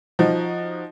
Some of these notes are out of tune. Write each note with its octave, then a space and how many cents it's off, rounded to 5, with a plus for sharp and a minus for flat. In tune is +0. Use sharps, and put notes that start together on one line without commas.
F3 +0 D#4 +0 F#4 +0